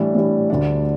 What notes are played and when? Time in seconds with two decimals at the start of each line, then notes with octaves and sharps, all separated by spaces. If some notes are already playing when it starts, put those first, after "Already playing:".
Already playing: A2 E3 G3 D4
0.14 A2 E3 G3 D4
0.50 D2 D3 G3 D4